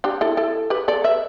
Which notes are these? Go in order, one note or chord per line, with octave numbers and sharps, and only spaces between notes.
D4 G4
E4 A4
E4 A4
G4 B4
A4 D5
B4 E5